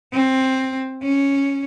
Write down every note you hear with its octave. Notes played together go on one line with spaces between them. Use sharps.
C4
C#4